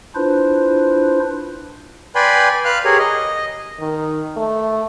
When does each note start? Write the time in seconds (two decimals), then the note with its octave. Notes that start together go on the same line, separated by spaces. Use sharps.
0.15 D4 E4 F4 B4 C5
2.15 B4 D5 G5 G#5 B5 C6
2.65 B4 F5 F6 F#6
2.85 G4 G#4 A#4 C#5
2.99 D#5
3.80 D#3
4.37 A3